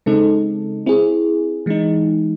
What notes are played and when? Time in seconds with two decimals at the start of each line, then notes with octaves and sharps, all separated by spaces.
0.06 C#3 G#3 C4 D#4 A4
0.86 C4 E4 G#4
1.66 E3 G#3 D#4